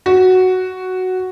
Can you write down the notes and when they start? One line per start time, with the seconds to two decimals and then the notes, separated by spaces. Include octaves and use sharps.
0.06 F#4